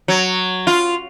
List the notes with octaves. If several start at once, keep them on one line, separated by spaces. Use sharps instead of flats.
F#3
F4